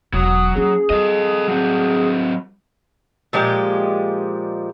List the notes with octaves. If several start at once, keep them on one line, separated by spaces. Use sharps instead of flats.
E1 F#3 D#6
A#3 C#4 G#4
G3 A4 D#5
F#3 C4
A#2 F3 G#3 G4